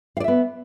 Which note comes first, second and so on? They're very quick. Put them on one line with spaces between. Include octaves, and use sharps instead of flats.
F5 D5 E5 B3